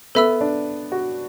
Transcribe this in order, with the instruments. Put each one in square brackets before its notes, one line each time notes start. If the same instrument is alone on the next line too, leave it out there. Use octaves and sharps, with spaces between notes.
[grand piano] B3 [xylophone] A4 E5 B5 E6
[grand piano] D4
F#4